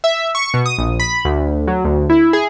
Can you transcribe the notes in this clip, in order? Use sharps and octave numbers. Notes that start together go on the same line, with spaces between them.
E5
C#6
B2
D#6
A#1
B5
D2
F#3
D2
E4
G#4